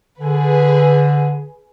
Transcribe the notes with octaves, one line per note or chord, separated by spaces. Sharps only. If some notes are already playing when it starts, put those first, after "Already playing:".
D3 G#4 B4